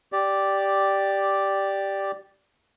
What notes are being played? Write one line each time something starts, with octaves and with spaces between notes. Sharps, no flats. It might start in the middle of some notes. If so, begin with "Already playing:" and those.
G4 D5